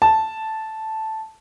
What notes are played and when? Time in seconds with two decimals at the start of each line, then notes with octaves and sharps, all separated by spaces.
0.02 A5